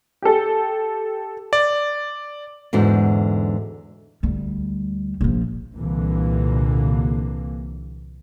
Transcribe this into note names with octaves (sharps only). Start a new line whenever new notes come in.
G4 A4
D5
E2 G#2 D3 F#4
D2 G3
A#1 F3
C2 A#2 D3 E3 A#3